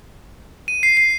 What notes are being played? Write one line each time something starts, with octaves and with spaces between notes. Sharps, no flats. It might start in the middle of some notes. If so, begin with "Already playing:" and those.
D#7
C7
C7